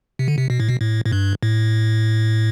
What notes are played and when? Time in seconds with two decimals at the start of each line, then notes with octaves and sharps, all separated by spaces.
0.19 C3
0.28 D3
0.38 C3
0.50 B2
0.60 A2
0.69 B2
0.81 A2
1.05 A2
1.12 G2
1.43 A2